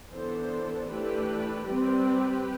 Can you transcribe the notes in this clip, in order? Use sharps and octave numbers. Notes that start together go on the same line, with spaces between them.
E3 B3 D4 A4 C5
E3 A3 D4 G4 B4
G3 C4 G4 B4